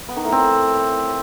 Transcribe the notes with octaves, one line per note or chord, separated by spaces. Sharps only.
B3
D#3
A2
C4